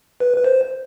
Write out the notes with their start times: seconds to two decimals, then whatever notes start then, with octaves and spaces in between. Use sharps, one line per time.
0.20 B4
0.37 B4
0.44 C5